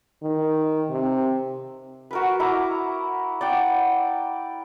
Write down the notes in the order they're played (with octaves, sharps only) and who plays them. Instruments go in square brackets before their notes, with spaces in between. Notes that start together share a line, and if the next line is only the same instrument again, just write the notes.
[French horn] D#3
C3
[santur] F#4 A#4 B4
E4 A#5 D6
D5 F#5 G5